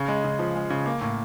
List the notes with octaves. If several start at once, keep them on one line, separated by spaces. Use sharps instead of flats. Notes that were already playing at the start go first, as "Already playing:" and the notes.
Already playing: C#3
G#3
C#3
F3
G#3
C#3
A#3
A2